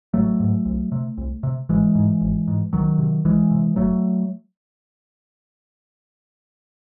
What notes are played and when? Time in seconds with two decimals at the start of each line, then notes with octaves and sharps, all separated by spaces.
0.14 A1 F#3 A3
0.40 G#2
0.66 C2
0.92 C3
1.18 C2
1.43 C3
1.69 G#1 E3 G#3
1.95 G#2
2.21 G#1
2.48 G#2
2.73 C2 D#3 F#3
2.98 C3
3.25 C2 E3 G#3
3.51 C3
3.76 F#1 F#3 A3